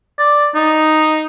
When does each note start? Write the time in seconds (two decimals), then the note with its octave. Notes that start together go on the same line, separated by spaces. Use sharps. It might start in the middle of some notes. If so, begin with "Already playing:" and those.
0.19 D5
0.55 D#4